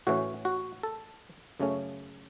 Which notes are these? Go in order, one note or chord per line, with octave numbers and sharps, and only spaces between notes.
A2 E3 C#4 F#4
F#4
A4
F#2 C#3 A3 C#4